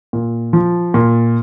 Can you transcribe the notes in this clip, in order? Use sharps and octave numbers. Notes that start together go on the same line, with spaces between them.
A#2
F3
A#2